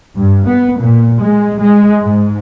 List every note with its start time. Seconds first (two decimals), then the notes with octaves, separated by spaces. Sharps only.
0.16 G2
0.48 B3
0.80 A#2
1.21 G#3
1.61 G#3
2.01 G#2